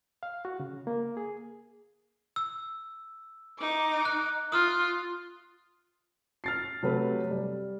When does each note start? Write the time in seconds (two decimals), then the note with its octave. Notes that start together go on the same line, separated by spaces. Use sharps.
0.23 F5
0.45 F#4
0.60 C#3
0.87 A#3
1.17 G#4
2.36 E6
3.60 D#4 D6
4.05 F#6
4.52 F4 D#6 F6
6.44 F6 A6 C7
6.83 C3 F#3 A3 B4
7.31 G3